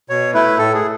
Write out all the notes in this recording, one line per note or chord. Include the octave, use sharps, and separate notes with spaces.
B2 C#5
A3 E4 B4
A2 A4
G#4